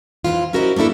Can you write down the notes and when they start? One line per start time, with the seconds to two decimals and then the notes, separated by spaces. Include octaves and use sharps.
0.24 F2 G#2 E3 F4
0.53 C#4 E4 F#4 A#4 C5 D#5
0.76 A3 A#3 D4 E4 A4